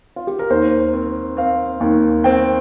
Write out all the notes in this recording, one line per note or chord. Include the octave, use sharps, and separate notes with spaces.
F4
G4
A#4
D#2 C5
C4
C4 F5
D#2
C4 G5